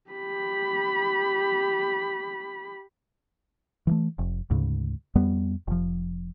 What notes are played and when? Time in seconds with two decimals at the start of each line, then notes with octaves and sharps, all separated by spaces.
0.10 G4 B5
3.87 E3 F3 A3
4.19 F1
4.50 D2 G#2 C#3
5.15 F2 G3 B3
5.67 F1 F3